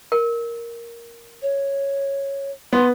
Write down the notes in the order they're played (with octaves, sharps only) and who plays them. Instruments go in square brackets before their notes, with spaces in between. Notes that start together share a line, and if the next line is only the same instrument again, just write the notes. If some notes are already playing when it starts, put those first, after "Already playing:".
[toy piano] A#4
[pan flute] C#5
[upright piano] B3 [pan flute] C6